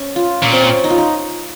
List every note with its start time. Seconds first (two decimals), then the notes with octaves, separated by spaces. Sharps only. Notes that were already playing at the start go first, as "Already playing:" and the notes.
Already playing: C#4
0.16 F4
0.42 A#2 C#4
0.52 C4
0.62 C#4
0.84 D#4
0.90 F4
0.98 D#4